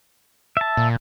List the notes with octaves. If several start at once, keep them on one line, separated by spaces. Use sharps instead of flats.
E5 A5
A#2